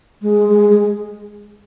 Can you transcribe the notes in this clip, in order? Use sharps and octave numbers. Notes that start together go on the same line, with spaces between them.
G#3
G#3
G#3